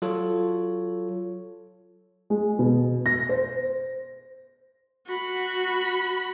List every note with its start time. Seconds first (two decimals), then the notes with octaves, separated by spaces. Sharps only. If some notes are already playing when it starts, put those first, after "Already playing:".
0.02 F#3 F4 A4 C#5
2.30 G#3
2.59 B2
3.06 A#6
3.29 C5
5.07 F#4 B5